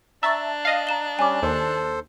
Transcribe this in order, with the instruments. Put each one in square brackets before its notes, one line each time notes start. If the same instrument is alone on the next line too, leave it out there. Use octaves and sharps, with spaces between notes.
[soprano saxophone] D4 [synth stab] E5 A5 [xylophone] A#5 C#6
[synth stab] D#5 F5
[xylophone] A#5 E7 G7
[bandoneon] G3 C#4 [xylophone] G#5 D6
[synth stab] D#2 [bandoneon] A4 C5